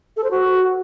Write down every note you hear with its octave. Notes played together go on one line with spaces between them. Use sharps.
A4
C5
F#4